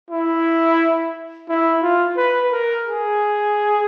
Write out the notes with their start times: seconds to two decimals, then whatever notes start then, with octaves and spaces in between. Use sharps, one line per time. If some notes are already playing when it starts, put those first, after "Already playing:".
0.11 E4
1.49 E4
1.82 F4
2.17 B4
2.52 A#4
2.86 G#4